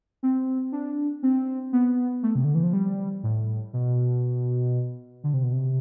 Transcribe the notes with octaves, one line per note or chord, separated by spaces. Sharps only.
C4
D4
C4
B3
A3
C3
D3
E3
F3
G3
A2
B2
D3
C3
B2
C3